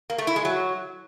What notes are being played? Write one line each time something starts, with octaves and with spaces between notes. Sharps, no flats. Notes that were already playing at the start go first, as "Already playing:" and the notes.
A#3
A3
E4
G#3
F#3